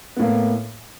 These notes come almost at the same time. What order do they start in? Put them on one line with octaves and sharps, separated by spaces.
B3 A2 A#3